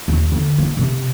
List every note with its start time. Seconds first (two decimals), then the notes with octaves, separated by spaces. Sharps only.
0.08 D#2
0.32 D3
0.58 A#3
0.77 C3